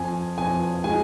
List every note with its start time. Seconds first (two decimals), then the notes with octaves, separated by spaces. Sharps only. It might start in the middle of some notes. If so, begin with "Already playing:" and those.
Already playing: F2 G#5
0.38 F2 G#5
0.84 G#3 G#5